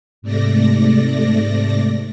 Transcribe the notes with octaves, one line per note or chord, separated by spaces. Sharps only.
G#2 C3 A3 D5 A#6